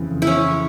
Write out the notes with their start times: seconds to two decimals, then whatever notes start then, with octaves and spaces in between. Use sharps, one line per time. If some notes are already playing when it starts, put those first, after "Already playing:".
Already playing: F2 C#3 E3
0.22 E4
0.27 C#4